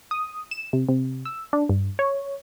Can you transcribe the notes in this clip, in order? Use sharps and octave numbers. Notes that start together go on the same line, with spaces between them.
D#6
E7
C3
C3
E6
D4
G2
C#5